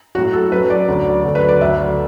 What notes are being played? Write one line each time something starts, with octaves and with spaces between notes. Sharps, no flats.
A2 F#3 F#4
A4
F#2 F#3 B4
D5
D2 D3 F#3
D2 D3 F#3
B4
D5
D2 D3 F#3 E5